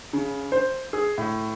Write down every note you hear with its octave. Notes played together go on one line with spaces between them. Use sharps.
C#3
C5
G#4
A2